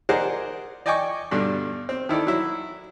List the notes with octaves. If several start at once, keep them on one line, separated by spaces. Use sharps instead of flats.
G#4 A#4 C5 D5 D#5 F#5
D5 D#5 G5 G#5 C#6 D6
G2 B2 D3 D4
C4
D#3 E4 A4 D5
F#3 E4